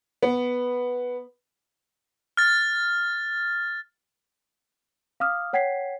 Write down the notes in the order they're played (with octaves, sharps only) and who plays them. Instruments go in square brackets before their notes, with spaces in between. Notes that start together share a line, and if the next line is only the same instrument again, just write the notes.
[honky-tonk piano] B3
[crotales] F6 A6
[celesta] F5 D6 D#6 F6
C#5 F#5 G5 G#6 B6 C7